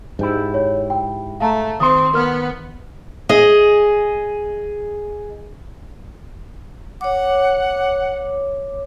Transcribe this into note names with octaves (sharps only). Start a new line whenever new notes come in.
G#2 E4 G4 D5
C#5
G5
A3 F5 A5 A#5
D#3 C4 C6 D#6
B3 A#4 F6
G#4 D#5
C#5 F#5 D6